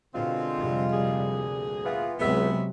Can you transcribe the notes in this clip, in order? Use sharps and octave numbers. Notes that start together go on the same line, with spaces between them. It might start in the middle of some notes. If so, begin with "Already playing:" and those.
B2 D3 G#3 C4 F4
F2 C3 G3
D2 A#2 G#4
E3 B3 F4
C#2 C3 F#3 G#3 B3 E5